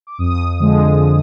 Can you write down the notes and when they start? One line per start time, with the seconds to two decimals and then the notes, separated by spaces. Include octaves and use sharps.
0.07 D6
0.18 F2 D#6
0.59 D3 F3 G#3